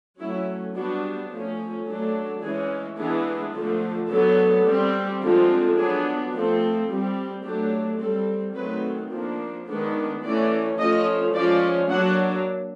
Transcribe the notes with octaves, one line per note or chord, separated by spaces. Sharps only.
F#3 A3 C#4 E4
G3 B3 D4 F#4
F3 A3 C#4
F#3 A3 D4
E3 G#3 C#4 G#4
E3 G#3 B3 D4 G#4
D3 F3 A3
D3 F#3 B3 A4
G3 C4
D3 F3 G#3 C4
F#3 B3 D4 G#4
F3 A3 C4 A4
G3 C4
F#3 A3 D4 G4
G3 C4 A4
D#3 F#3 A3 C4 B4
F3 A#3 D4
D#3 G#3 B3 D4
E3 A3 C#4 D5
F3 A3 C#4 D#5
F3 G#3 C#4 D5
F#3 A#3 D4 F#5